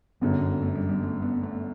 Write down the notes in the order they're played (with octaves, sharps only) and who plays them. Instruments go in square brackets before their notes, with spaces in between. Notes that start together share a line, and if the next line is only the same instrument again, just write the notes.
[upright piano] G1 F#2 D3 [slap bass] B3
[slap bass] A3
G3
G3
A3
B3
A3